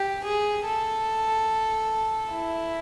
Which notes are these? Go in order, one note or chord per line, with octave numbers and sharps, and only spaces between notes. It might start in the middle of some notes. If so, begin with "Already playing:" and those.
Already playing: G4
G#4
A4
E4